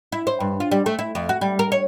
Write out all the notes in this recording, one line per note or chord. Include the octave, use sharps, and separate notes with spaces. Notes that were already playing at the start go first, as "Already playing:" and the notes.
E4
C5
G2
F4
G3
A3
E4
F2
F#4
G3
A#4
C#5